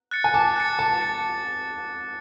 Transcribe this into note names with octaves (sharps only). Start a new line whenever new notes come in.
F#6 A6 C#7
G#5
A5 D6
F#6 A6 C#7
A5 D6
F#6 A6 C#7